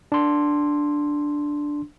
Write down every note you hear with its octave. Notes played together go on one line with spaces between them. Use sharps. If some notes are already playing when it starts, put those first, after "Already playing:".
D4 C6